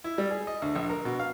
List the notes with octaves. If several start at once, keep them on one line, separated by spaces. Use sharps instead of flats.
E4
G3
G#4
D#5
D2
A#1
A#4
B2
F5